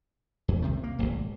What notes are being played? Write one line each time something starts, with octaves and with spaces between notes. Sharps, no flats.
E2
C2 C3 D#3
A#3
D1 G#1